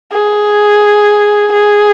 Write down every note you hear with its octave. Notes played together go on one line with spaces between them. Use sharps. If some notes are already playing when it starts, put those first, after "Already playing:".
G#4
G#4